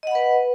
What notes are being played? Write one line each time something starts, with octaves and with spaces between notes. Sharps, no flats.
B4 D#5 F#5 B5